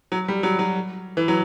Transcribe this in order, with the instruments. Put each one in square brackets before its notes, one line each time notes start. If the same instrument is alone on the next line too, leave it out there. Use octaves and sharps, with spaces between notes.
[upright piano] F#3
G3
F#3
F#3
E3
F#3